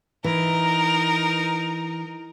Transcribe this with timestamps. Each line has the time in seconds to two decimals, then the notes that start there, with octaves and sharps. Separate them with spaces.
0.24 E3 D#4 A#4